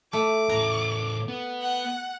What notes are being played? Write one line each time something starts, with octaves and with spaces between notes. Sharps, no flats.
A3 D6
E2 A2 A#5
B3
F#5